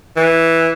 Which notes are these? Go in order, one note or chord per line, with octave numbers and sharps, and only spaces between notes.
E3